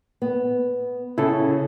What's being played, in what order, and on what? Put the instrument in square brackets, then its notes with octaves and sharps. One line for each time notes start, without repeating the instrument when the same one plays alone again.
[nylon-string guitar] B3
[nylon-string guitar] C#3 [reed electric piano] E4 A4